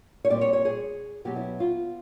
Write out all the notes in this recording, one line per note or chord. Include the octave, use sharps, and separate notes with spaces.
C#5
A#2 G3 C4 D5
C#5
C#5
G#4
B2 F#3 B3 G4
E4
F4